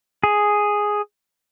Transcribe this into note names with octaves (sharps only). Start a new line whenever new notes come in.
G#4